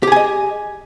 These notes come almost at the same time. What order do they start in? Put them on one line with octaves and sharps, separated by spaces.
G4 G#4 G#5 D#5